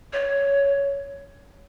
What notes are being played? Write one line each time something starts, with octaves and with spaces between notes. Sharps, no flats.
C#5